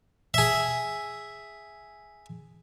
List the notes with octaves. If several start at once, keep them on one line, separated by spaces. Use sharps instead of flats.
G#4 E5